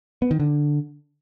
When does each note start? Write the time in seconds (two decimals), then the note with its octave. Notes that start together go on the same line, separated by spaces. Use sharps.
0.22 B3
0.31 D#3
0.40 D3